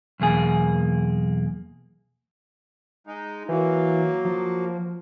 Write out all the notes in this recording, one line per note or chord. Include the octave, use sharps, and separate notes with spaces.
B1 E2 A#3 G#4
G#3 D#4
E3 F#3 A#3
F3